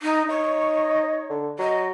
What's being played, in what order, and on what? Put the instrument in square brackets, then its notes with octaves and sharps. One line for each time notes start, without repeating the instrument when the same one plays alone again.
[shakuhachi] D#4
[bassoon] D#4 [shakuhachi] C#5
[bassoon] D3
[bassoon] F#3 [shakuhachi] D#5